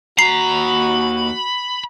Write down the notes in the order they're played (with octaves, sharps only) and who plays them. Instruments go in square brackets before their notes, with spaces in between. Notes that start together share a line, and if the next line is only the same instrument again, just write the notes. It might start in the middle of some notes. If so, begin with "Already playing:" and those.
[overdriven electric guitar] D#2 A#5 [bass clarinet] F#4 [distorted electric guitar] B5 [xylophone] C7